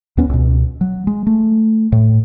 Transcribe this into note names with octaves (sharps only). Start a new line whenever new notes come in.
D#2 B3 C#4
C#2 B2
F#3
G#3
A3
A2